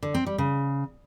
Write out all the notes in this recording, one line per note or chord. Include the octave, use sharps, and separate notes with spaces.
D3
C4
G3
C#3